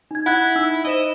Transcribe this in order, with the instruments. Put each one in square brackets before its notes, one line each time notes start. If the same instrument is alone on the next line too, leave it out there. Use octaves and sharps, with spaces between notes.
[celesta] D#4 G#6
[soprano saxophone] E4 [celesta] F#5 F#6 G#6
[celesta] D#4 E6
[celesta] D#4 C5 E7 [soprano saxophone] D#5